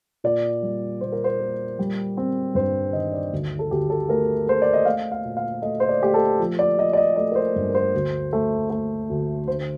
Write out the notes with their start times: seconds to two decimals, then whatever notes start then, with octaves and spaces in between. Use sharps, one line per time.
0.24 A#2 D5
0.62 G3
1.01 A#2 C5
1.12 A#4
1.24 C5
1.40 A#3
1.79 G3
2.17 C4
2.55 G2 C5
2.93 D#3 D#5
3.13 D5
3.32 D2
3.59 A4
3.71 D2 G4
3.90 A4
4.09 A3 A#4
4.47 A3 C5
4.62 D5
4.73 D#5
4.85 A3 F5
5.12 F5
5.25 A#2
5.37 F5
5.62 A3 D#5
5.80 C5
5.89 D5
6.02 A3 G4
6.14 A4
6.39 F3
6.59 D5
6.78 F3 D#5
6.93 D5
6.97 D#5
7.16 A3 D5
7.32 A#4
7.35 C5
7.56 G2
7.69 A#4
7.75 C5
7.94 D2
8.33 A3
8.70 A3
9.09 D2
9.48 D3 C5